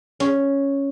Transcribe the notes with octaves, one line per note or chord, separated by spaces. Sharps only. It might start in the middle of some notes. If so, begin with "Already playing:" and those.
C#4